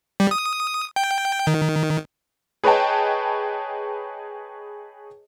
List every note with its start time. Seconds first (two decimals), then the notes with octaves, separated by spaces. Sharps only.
0.20 G3
0.31 D#6
0.96 G5
1.47 D#3
2.64 G#4 B4 C#5 D#5 G5 A5